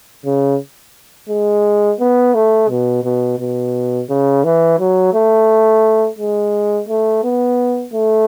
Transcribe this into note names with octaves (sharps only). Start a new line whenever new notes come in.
C#3
G#3
B3
A3
B2
B2
B2
C#3
E3
F#3
A3
G#3
A3
B3
A3